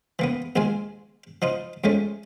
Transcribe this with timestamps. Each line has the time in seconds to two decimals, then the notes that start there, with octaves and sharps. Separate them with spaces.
0.19 E3 A#3 B3
0.56 A#1 D#2 G#3 F4 G#5
1.42 F3 D#4 F4
1.84 F2 G#3 A3 C#4